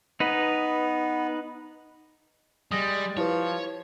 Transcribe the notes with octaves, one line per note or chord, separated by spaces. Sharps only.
B3 D#4 B4
G3 G#3 D#6 A#6
F3 E4 G4 B4 C#5